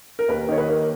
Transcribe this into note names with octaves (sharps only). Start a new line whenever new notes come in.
A#4
D#2 B4
D#3 C#5
B4
A#3